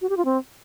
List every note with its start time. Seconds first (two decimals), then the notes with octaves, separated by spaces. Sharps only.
0.01 F#4
0.09 G4
0.17 F4
0.25 C4